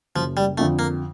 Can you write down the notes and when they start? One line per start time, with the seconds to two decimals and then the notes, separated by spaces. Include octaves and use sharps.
0.15 F#1 F3
0.37 G3
0.58 F2 D3 A3
0.79 A#3